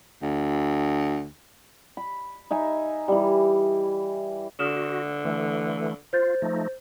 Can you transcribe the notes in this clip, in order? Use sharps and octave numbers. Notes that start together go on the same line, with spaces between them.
D2
B5
D#4 E5 G#5
E3 G3
D3 F#4 D#6 F6 E7
E3 A3
F4 C5 G6 A6
F3 A3 D#4